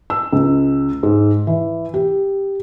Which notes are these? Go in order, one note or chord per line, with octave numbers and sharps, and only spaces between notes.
E6
C#2
G#2
E3
G4